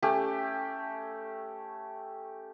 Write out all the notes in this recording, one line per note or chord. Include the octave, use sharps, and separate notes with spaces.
A3 C#4 G4